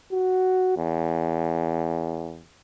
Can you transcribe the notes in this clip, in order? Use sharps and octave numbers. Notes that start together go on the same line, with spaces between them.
F#4
E2